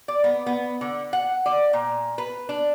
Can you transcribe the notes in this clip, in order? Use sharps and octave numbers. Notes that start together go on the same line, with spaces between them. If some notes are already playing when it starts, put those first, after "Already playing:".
D5
B3
B3
D3
F#5
D5
A#2
B4
D4